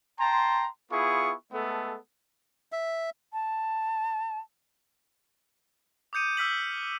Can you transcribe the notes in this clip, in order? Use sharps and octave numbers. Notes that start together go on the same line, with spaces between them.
G5 A5 A#5 C6
B3 E4 F4 G#4 C#6
G#3 A3 B3 A4
E5
A5
D6 D#6 G6 C#7 D#7
E6 F6 B6 F#7
F#7